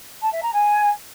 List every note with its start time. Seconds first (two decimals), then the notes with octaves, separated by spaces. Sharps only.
0.21 A5
0.32 E5
0.42 A#5
0.53 G#5